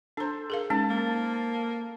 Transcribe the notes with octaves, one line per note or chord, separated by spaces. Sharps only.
D4 A4 C5 A#5
G#4 A#4 F5
G#3 C#4 D#4 A5
A#3